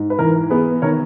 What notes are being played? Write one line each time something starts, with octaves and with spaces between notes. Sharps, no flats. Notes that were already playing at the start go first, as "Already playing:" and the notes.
Already playing: G#2
B4
E3 A#4
B3 G#4 B4
D#3 A#4 C#5